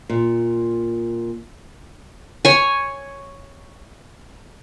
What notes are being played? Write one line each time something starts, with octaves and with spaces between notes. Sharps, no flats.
A#2
C#5 G#5